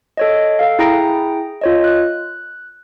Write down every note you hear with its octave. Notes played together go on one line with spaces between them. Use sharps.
A4 C#5 D#5
A4 F5
E4 G#4 G5 A#5 A#6 D7
F4 C#5 D#5
F#6